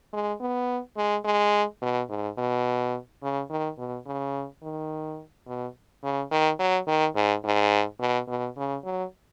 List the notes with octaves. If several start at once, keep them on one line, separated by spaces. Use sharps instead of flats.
G#3
B3
G#3
G#3
B2
G#2
B2
C#3
D#3
B2
C#3
D#3
B2
C#3
D#3
F#3
D#3
G#2
G#2
B2
B2
C#3
F#3